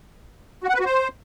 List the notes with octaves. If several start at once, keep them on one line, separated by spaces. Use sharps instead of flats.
F#4
F#5
B4
F#4
C5